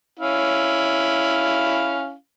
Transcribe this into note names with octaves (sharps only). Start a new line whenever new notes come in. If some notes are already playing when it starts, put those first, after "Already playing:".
C#4 E4 F5